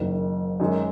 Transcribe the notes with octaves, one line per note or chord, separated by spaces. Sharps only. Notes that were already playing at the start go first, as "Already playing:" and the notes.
Already playing: F#1 F#2 D#3
F#2 D#3 G#3